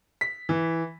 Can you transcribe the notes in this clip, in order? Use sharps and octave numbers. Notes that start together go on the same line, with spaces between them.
B6
E3